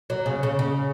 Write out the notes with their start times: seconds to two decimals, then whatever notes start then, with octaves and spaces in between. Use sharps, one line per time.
0.10 F#3
0.26 C#3
0.43 C#3
0.59 C#3